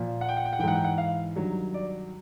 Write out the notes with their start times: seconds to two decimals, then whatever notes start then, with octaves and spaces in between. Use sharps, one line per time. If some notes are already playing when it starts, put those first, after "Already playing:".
Already playing: A#2 F3
0.21 F#5
0.29 G5
0.37 F#5
0.45 G5
0.53 F#5
0.59 E3 G5
0.63 G#2 F#5
0.76 G5
0.84 F#5
0.98 F5
1.36 G2 D#3 F#3
1.74 D5